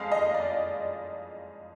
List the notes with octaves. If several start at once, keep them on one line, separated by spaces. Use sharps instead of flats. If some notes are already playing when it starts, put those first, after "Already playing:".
Already playing: F2 G#3 F5
D#5
D5